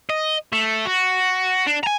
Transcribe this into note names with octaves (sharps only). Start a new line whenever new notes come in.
D#5
A3
F#4
D4
G#5 A#5